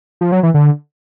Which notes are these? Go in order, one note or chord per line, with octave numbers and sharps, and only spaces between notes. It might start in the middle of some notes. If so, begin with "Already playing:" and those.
F3
F#3
E3
D3